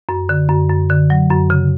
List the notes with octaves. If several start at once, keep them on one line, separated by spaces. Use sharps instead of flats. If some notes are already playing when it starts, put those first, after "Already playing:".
F#2
D3
F#2
F#2
D3
F#3
F#2
C#3